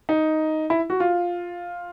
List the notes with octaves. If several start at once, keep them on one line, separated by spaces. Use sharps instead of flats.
D#4
E4
F#4
F4